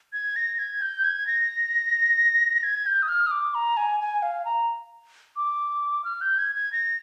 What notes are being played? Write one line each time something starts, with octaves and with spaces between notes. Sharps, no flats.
G#6
A#6
G#6
G6
G#6
A#6
G#6
G6
D#6
F6
D#6
D6
A#5
G#5
G#5
F5
A#5
D6
F6
G6
G#6
G#6
A#6